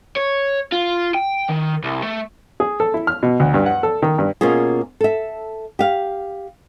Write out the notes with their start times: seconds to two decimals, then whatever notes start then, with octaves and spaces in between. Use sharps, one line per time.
0.16 C#5
0.72 F4
1.14 G5
1.49 D#3
1.83 C2
2.03 A3
2.60 G#4
2.80 A4
2.94 E4
3.07 F6
3.23 B2
3.40 D2
3.54 G2
3.66 F#5
3.83 A4
4.02 D#3
4.18 G2
4.41 B2 A#3 C#4 F4 G#4
5.01 A4 E5
5.79 G4 F5